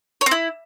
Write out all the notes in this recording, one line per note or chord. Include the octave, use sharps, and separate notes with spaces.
C#5
C4
E4